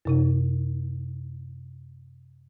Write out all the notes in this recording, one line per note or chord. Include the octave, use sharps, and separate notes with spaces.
F#2 C3 D#4